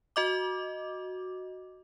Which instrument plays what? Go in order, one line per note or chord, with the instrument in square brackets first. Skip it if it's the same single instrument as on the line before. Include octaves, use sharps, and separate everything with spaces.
[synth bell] F#4 D#5 D6